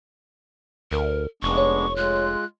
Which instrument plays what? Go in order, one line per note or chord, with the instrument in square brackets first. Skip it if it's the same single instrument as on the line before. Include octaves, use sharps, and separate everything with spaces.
[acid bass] D2 [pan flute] A#4
[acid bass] F1 [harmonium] G#3 B3 D4 [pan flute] C#6
[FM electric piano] C#5
[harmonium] G#3 F4 [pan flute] F#6